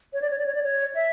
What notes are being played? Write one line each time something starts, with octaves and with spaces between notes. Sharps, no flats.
C#5
D5
C#5
D5
C#5
D5
C#5
E5